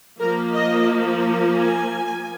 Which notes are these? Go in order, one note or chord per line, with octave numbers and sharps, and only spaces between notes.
F3 A#3 A#4
D#5
G#5